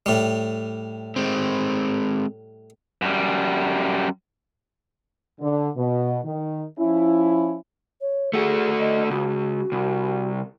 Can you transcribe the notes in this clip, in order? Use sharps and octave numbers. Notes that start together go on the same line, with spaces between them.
A2 G3
G#3 C4
F#2 G3
D3
B2
D#3
F3 C#4 E4
C#5
A3 F#4 G#4
D#5
C#2 F#4
C2